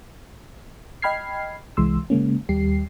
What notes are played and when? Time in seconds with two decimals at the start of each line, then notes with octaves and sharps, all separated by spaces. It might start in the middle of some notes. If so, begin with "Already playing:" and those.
1.02 D#5 G5 B5 F6 G#6 C7
1.77 C2 E3 G#3 C6 E6
2.10 C#3 G#3 A#3 C#4
2.49 D#2 G3 G4 C7